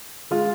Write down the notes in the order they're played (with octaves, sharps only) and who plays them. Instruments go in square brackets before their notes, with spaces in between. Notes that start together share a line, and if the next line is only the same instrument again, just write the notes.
[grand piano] G#3 F4